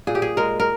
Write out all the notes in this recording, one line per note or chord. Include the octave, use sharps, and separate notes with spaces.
A#2 G#4
G4
G#4
G#3 A#4
A#4